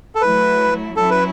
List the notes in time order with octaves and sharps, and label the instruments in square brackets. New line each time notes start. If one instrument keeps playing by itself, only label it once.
[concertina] A4
[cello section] F#3 A3 E4 [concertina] B4
[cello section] F#3 C#4 E4 [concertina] A4
[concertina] B4